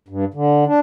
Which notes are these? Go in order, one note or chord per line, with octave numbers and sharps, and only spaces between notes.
G2
D3
D4